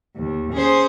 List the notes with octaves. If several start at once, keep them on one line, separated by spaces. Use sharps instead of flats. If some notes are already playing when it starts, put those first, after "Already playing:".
D#2
C#4 G#4 C5